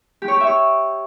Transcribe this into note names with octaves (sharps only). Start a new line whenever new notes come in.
G4
C#5
G4
E5
C#5